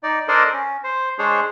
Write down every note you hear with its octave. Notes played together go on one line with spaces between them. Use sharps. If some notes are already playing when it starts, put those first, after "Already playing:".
D#4 D5
D4 A4 A#4 C5 D5 D#5
C#4
C5
G#3 D4 G#4 C5 C#5